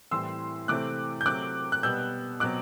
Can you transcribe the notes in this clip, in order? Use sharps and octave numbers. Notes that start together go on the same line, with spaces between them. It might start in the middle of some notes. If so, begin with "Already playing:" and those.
A2 E3 G3 C4 C6 E6
C3 E3 A3 C4 D6 F#6
G6
C3 F#3 A3 C4 D6 F#6
F#6
B2 G3 B3 E6 G6
B2 F#3 C4 D6 F#6